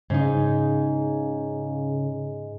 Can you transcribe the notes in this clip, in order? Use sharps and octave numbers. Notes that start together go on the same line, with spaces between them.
G#2 C#3 D#4